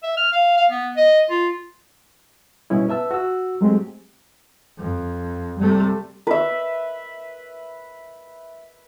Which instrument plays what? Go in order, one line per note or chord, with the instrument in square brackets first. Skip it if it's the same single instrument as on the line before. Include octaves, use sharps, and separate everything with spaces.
[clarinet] E5
F6
F5
F5
B3
D#5
F4
[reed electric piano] B2 G3 B3 C#4 E4
B4 E5 A5 E6
F#4 E6
F#3 G#3 A3 C4 G4
[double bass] F2
[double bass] C3 A3 [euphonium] G3
[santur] B4 E5